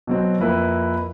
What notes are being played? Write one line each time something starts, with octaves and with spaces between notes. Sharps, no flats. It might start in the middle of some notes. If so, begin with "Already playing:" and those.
B2 F#3 C4
F2 A#3 E4 B4